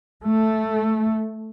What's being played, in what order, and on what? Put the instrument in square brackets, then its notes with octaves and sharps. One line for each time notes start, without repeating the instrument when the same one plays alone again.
[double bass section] A3